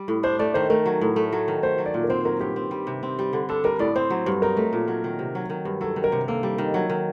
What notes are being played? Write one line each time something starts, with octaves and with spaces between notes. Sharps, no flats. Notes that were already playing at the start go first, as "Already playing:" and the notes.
Already playing: G3
A2
D4 C5
A3 D5
D#3 C5
A3 A#4
F#3
A2
A3
F#3
D#3
A3 C5
F#3
D5
A#2
A#4
C4 C5
F#3 A#4
G2 G4
C4
G3
C3
C4
G3
D3
D4 A4
G3 A#4
A2 D5
C4 C5
F#3
G2
D#4 A#4
A3
A#2
F#3
D#3
C3
F#3
D#3
G2
F#3 A4
D#3
A#4
C3
A#3 A4
G3
D#3
F#3
D#3